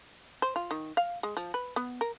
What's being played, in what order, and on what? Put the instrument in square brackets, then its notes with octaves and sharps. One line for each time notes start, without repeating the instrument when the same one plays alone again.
[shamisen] C5
F4
D#3
F5
G#3
F3
B4
B3
A#4